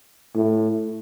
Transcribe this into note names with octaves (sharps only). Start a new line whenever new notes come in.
A2